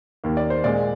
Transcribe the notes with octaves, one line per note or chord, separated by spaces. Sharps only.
D#2 D#3 A#3
D5
C5
A#2 G#3 D5